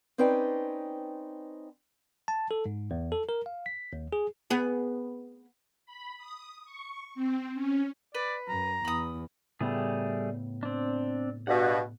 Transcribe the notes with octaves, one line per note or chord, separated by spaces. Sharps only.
C4 C#4 D#4 B4 D5 G5
A5
A4
G#2
E2
A4
A#4
F5
B6
D#2
G#4
B3 G#4
B5
D#6
C#6
C4
C#4
B4 D5
F#2 A#5
E2 B5 D#6
A2 C#3 G3 A3 B3 G#4
C4 D4
G2 B2 F#5